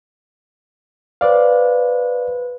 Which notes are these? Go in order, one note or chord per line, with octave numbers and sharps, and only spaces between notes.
B4 C5 D5 F5